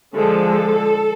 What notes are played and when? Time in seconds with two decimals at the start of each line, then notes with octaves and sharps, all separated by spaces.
0.14 D3 F3 G#3 A4